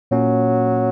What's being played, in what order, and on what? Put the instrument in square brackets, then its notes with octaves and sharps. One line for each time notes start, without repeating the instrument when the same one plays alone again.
[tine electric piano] A#2 A#3 C#4 [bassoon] F#3